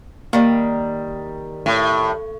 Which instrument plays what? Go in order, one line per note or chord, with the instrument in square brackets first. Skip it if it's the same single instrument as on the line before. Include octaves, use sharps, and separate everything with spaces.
[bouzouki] D#3 G3 [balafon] A#3
[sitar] A2